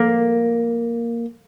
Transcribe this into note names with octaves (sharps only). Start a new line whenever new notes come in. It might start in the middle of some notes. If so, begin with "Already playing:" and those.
Already playing: A#3